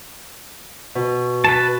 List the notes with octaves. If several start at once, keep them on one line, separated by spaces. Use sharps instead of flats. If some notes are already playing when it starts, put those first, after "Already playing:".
B2
B4 A5